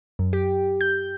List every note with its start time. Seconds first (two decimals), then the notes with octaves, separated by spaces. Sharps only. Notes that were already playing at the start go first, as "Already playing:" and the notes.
0.19 F#2
0.33 G4
0.81 G6